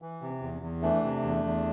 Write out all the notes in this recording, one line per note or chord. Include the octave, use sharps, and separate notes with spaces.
E3
C3
E2
E2
E3 A3 D4
C3
E2
E2